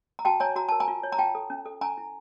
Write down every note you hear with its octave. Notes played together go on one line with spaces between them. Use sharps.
A#5
F#4 G5 A5
C#5 G#5 A#5
F#4 A#5
A#4 A5
G#5 A#5
F4
C#5
A#5
F4 G5 A5
A4
C#4
A4
C#4 G#5 A#5
E4